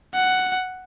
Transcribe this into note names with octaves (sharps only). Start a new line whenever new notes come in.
F#5